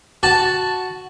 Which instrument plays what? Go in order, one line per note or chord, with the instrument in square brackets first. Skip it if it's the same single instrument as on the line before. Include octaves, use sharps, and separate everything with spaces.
[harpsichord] F#4 A5